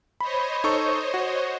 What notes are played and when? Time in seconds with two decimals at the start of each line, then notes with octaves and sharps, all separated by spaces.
0.21 C5 C#5 D#5 B5
0.64 D#4 A4 C#6
1.14 F#4